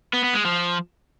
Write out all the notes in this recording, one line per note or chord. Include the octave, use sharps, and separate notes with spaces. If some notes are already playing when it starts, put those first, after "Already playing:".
B3
B3
G#3
F3